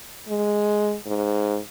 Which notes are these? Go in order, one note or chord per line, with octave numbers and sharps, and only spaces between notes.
G#3
G#2